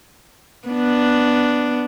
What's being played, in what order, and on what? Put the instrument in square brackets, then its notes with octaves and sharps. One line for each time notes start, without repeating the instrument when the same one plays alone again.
[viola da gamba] B3 D4